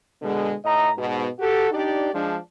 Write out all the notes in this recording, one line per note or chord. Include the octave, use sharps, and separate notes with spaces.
B2 D3 G#3
A2 D#5 A#5
G#2 B2
F#4 G4 A4
D4 D#4 G4 D5
F3 G#3 D4